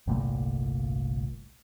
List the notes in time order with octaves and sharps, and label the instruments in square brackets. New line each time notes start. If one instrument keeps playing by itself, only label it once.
[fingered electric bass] G1 C2 A#2 A3